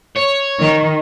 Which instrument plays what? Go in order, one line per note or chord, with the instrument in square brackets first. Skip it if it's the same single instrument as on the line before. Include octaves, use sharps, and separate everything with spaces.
[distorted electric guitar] C#5
[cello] D#3